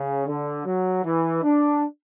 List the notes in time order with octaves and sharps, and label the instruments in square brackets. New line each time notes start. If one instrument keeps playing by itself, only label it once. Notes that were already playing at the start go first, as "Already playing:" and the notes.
Already playing: [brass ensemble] C#3
D3
F#3
E3
D4